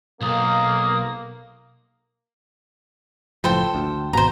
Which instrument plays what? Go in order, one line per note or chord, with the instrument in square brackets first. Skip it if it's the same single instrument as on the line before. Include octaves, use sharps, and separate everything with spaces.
[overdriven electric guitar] B1 [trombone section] A#3 [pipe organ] D#6
[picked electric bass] F#1 A2 F3 [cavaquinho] A4 C5 G5
[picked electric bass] D2
[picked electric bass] G#1 B2 [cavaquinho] C5 A#5